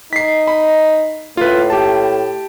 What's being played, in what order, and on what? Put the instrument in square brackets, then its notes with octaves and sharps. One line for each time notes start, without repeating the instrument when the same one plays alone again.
[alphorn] D#4 [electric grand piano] B6 C7
[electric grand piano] B5
[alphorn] A2 [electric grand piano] F4 B4
[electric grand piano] G4 A5